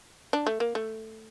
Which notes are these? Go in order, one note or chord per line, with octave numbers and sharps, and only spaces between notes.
D4
A3
A#3
A3